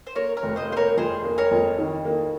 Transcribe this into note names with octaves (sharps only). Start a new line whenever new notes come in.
C5
A#3 A#4 C#5
A#4 C#5
F1
C5 D#5
A#3 C5
A#4 C#5
F2 G#4 C5
A#3
A#4 C#5
F2
D#3
A#3